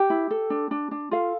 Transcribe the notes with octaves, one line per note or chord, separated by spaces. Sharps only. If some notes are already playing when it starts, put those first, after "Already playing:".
Already playing: G4 G5
E4
A4
D4
D4
D4
F4 A4 F5